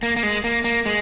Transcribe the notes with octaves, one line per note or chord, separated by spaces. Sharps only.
A#3
A#3
G#3
A#3
A#3
G#3